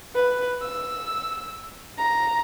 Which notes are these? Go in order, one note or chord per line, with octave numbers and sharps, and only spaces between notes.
B4
E6
A#5